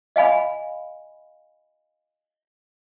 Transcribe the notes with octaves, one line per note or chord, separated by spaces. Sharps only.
D#5 F5 G#5 B5